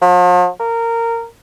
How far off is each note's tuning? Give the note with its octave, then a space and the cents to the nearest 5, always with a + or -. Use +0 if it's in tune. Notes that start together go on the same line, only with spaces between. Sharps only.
F3 +45
A#4 -15